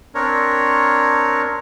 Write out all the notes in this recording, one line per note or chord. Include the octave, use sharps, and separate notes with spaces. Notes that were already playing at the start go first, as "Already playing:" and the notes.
C4 D4 A#4 C#5